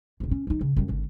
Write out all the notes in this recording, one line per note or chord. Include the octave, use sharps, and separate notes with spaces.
D#1 D3
C#4
F3 D#4
C#3
F#2 G3
G#1 D3